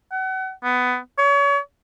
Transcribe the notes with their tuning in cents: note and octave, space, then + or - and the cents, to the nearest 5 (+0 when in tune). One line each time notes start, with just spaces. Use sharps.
F#5 +35
B3 +15
C#5 +35